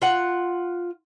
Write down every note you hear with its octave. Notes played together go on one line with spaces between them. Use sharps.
F4 F#5